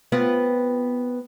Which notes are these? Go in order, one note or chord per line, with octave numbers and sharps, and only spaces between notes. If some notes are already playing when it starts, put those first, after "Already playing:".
B3 C4 F4